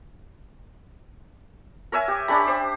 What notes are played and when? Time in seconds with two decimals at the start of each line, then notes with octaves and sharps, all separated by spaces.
1.92 A#4 C#5 E5 G#5
2.08 G4
2.28 C#4 D4 G4 B5
2.47 C5